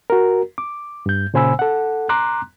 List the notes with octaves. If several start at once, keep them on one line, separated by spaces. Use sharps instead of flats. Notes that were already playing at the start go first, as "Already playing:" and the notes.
F#4 A#4
D6
G2 G6
A#2 C#3 C5 G#5 B5 E6
A4 F#5
A#5 C6 D6 F#6